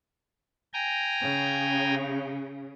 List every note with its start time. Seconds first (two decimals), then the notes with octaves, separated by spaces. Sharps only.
0.74 G5 G#5 A#5
1.21 C#3